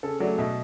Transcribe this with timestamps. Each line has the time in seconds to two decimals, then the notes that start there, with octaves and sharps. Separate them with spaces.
0.03 C#3 A4
0.20 F#3 A3 D5
0.38 B2 E5